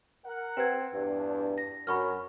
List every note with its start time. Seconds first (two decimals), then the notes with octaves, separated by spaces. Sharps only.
0.24 A#4 F#5
0.57 C4 B4 G#6
0.94 E2 G2 D4
1.58 A#6
1.87 F#2 F#3 B5 C#6 F6